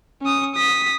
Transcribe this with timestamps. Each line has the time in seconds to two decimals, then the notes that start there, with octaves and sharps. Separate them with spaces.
0.22 C#4 D#6
0.55 D#6 B6